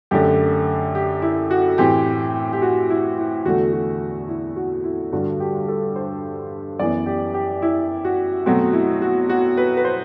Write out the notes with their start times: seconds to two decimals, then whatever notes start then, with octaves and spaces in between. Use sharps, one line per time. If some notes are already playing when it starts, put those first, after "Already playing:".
0.11 F#2 D3 A3 G4
0.95 G4
1.22 E4
1.50 F#4
1.78 A2 E3 A3 C4 G4
2.53 G4
2.62 F#4
2.90 E4
3.18 E4
3.45 E2 D3 A3 F#4
3.73 F#4
4.28 E4
4.56 F#4
4.84 E4
5.12 G2 D3 G3 F#4
5.40 G4
5.68 A4
5.96 C5
6.79 F#2 E3 B3 D5
7.06 G4
7.34 G4
7.62 E4
8.05 F#4
8.46 B2 F#3 A3 C4 F#4
8.73 E4
9.02 F#4
9.29 F#4
9.57 B4
9.77 B4
9.85 C5